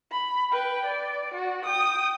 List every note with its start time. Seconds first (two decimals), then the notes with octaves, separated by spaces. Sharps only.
0.12 B5
0.52 B4 G5
0.86 D5
1.34 F#4
1.65 G5 D#6